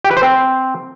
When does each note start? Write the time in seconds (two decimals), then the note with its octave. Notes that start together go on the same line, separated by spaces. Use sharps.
0.05 G4
0.11 B4
0.17 C5
0.23 C4